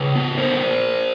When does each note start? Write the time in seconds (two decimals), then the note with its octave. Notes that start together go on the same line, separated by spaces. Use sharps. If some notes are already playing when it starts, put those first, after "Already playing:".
Already playing: C#3 B4 C#5
0.16 B3
0.38 D3 A#4 C5